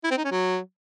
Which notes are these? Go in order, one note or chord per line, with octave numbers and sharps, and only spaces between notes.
E4
C4
D#4
C#4
F#3